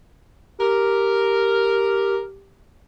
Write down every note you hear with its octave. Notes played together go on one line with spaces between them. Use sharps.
G4 A#4